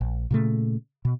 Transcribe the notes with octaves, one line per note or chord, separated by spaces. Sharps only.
A#1
A#2 C#3 A3
B2